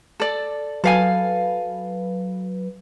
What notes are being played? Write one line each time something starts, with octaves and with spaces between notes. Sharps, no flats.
A4 D5
F#3 A4 B4 F5 G#5